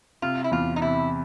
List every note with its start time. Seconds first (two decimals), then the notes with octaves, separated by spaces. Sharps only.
0.22 C3 F4
0.44 E4
0.51 E2 F4
0.76 D#4
0.81 C3 E4